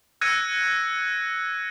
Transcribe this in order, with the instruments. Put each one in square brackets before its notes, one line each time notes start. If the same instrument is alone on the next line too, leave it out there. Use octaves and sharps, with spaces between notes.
[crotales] E6 F#6 G#6 A#6 C#7 D#7